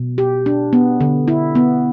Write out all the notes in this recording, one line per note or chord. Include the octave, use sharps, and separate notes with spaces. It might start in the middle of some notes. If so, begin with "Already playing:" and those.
Already playing: B2
G4
D4
B3
D3
E4
B3